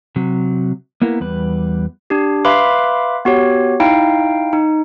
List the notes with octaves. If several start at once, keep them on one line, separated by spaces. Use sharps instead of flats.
C3 F#3
A#3 B3 E4 A#4
E2 G3 B4
D4 G4
B4 E5 F5 B5 C6 D6
B3 F#4 G4 C#5
D#4 E4 F5 G5
D#4